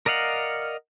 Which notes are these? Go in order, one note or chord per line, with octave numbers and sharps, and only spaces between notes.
A#4 D5 D#5 F5 F#5